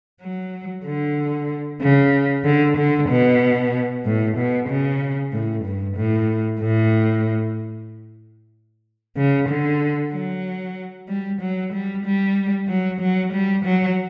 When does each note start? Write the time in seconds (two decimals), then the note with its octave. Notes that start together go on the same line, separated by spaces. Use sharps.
0.21 F#3
0.85 D3
1.81 C#3
2.44 D3
2.77 D3
3.09 B2
4.05 A2
4.37 B2
4.69 C#3
5.33 A2
5.64 G2
5.96 A2
6.60 A2
9.17 C#3
9.48 D3
10.12 F#3
11.09 G3
11.41 F#3
11.73 G3
12.05 G3
12.68 F#3
13.01 F#3
13.33 G3
13.65 F#3